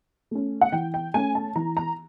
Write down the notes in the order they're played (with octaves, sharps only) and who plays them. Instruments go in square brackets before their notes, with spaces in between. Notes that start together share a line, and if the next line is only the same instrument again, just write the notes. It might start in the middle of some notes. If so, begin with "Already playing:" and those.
[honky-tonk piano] A3 C#4
F#5
E3 G5
G5
A3 C#4 G#5
A5
E3 A#5
A#5